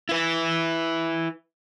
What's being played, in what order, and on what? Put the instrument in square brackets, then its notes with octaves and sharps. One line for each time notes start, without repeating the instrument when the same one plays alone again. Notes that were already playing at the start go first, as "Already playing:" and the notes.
[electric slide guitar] E4 B4